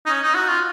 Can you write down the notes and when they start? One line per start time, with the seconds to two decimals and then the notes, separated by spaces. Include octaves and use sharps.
0.06 D#4
0.09 C#4
0.22 D#4
0.35 F#4
0.48 F4